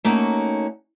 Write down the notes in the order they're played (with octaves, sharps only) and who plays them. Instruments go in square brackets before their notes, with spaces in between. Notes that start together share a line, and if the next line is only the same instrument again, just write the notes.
[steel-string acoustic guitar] A3 A#3 C#4 D#4 F#4